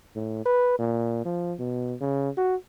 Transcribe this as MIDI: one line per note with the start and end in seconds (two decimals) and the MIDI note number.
0.15 0.41 45
0.46 0.75 71
0.79 1.23 46
1.25 1.54 53
1.59 1.94 47
2.01 2.30 49
2.37 2.55 66